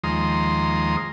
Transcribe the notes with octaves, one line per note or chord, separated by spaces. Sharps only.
D#2 F3 G#3 A#5 C6 D#6